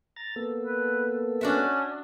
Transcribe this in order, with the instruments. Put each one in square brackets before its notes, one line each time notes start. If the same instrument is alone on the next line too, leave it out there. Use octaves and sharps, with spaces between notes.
[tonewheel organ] A#5 A6
A#3 B3 A4
[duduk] B4
[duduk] C#4 [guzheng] D4 F#4 E5